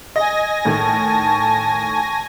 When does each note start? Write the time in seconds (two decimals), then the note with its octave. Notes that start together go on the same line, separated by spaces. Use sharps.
0.16 D#5 G#5 A#6
0.65 A2 D#3 A3 A5 C#6